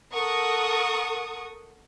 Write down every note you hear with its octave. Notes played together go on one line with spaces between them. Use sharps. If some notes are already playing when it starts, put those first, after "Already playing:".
A4 A#4 F#5 C#6 D#6